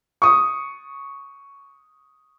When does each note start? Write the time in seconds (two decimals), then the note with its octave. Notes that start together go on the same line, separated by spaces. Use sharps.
0.22 C#6 D#6